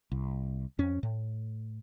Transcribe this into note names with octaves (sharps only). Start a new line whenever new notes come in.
C2
F2 C#4
A2